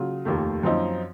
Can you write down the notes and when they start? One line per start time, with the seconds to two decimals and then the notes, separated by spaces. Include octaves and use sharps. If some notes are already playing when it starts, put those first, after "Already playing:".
Already playing: C#3 F#3 F4
0.25 F1 D#2 D#3 A3
0.63 F#2 F3 C4 D#4